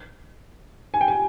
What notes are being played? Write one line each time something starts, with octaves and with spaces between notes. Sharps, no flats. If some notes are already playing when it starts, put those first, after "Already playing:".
G#5
G5
G#5